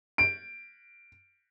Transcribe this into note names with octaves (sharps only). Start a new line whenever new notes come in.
D7